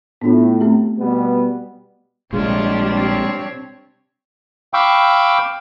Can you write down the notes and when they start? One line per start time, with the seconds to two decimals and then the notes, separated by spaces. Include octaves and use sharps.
0.22 A2 B3 D4 F4
0.61 A3 C4 G4
0.97 B2 G3 B3
2.33 A#1 C3 G3 G#3 D4 F4 C#5 D#5
2.93 C4 C#5
4.74 F5 G5 B5 C#6 D6 E6